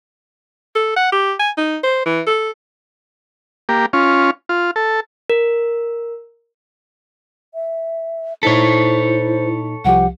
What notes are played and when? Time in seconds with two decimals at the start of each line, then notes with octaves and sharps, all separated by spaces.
0.75 A4
0.96 F#5
1.12 G4
1.39 G#5
1.58 D#4
1.83 C5
2.06 E3
2.27 A4
3.69 A#3 G4
3.93 C#4 F4
4.49 F4
4.76 A4
5.30 A#4
7.54 E5
8.43 A#2 D#4 E4 A4 C5 C#5 B6
9.85 C2 F3 G4 F#5